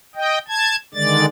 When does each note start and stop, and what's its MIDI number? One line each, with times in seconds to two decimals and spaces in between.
0.15 0.38 75
0.15 0.38 79
0.48 0.76 81
0.48 0.76 92
0.94 1.26 50
0.94 1.26 51
0.94 1.26 56
0.94 1.26 74
0.94 1.26 93